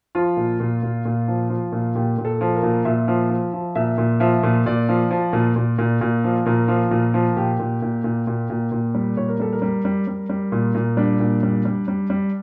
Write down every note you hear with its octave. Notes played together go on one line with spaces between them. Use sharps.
F3 F4
A#2
A#2
A#2
A#2
F3
F3
A#2
A#2 G4
A#2
A4
F3
A#4
A#2
A#2 E5
F3
F3
F3
A#2 E5
A#2
F3 E5
A#2
A#2 D5
F3
F3
A#2
A#2
A#2
A#2
F3
A#2 A#4
F3
A#2
F3
A#2 G4
A#2
A#2
A#2
A#2
A#2
A#2
G3
A#2 C#5
A#4
G3 A4
A#4
G3
G3
G3
G3
A#2
A#2
G3 D4
A#2
G3
G3
G3
G3